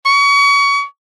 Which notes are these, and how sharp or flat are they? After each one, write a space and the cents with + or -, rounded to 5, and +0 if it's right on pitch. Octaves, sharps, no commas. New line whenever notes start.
C#6 +30